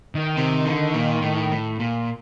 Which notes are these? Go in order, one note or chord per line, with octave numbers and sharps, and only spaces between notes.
D#3
C3
D3
A#2
A2
A2
A#2